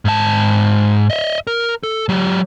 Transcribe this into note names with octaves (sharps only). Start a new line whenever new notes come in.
G#2 A5
D#5 E5
A#4
A4
F#3 G4